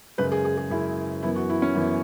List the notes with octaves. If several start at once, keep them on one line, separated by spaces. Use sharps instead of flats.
F#2 C#3 G#3 B4
G#4
G#4
G#4
F#2 C#3 G#3 E4
F#2 E3 B3 E4
F#4
E4
C#4
F#2 E3 B3 E4